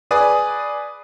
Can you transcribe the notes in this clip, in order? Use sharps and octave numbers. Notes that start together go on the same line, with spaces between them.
G#4 B4 D5 D#6